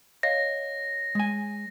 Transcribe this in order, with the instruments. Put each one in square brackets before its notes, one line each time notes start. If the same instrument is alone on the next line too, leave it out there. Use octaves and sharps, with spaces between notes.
[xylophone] C#5 D#5 F5 [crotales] A#6
[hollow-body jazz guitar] G#3 G#5